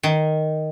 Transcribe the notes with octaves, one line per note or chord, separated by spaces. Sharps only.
D#3